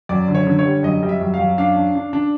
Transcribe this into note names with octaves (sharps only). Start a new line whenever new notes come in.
F#2 D5
D3
C#5
D3
C#5
G3
F#2 D#5
G3 D#5
E5
F#2
F#2 F5
D4 F5
D4
D4
D4